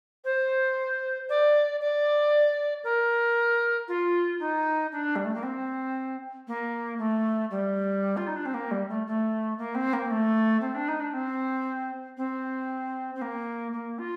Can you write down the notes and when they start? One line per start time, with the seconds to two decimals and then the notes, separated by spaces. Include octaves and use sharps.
0.25 C5
1.29 D5
1.80 D5
2.84 A#4
3.88 F4
4.40 D#4
4.92 D4
5.16 G3
5.24 A3
5.35 A#3
5.43 C4
6.48 A#3
6.98 A3
7.51 G3
8.17 F4
8.27 D#4
8.36 D4
8.45 C4
8.54 A#3
8.71 G3
8.89 A3
9.07 A3
9.58 A#3
9.75 C4
9.93 A#3
10.11 A3
10.61 C4
10.75 D4
10.88 D#4
11.00 D4
11.13 C4
12.17 C4
13.15 C4
13.21 A#3
13.73 A#3
13.99 F4